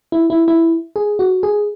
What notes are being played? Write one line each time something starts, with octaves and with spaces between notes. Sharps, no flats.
E4
E4
E4
G#4
F#4
G#4